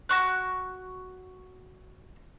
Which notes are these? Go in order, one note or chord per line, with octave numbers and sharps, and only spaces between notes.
F#4 C#6 F#6